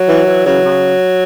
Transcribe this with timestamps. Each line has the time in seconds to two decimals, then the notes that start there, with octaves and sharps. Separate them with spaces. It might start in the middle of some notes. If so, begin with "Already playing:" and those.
Already playing: F#3
0.09 E3
0.27 E3
0.46 C#3 F#3
0.64 C#3